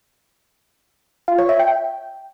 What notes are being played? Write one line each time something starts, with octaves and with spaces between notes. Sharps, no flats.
F4
C#5
E5
G5